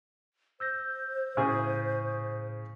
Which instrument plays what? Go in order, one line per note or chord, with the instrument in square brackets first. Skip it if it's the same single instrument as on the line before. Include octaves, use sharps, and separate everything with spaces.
[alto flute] C5 [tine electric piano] E6 G6 A#6
[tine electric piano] A2 [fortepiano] C#3 G#4